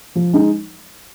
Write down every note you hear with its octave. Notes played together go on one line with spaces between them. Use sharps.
F3
G#3 D#4